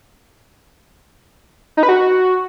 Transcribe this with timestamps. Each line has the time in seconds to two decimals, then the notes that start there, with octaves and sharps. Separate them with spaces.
1.77 D#4
1.83 B4
1.89 F#4